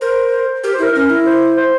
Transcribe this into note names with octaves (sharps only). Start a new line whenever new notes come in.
A#4 C5
C5
G4 A#4
C5
E4 A#4
C#4 A#4
E4
C5
C5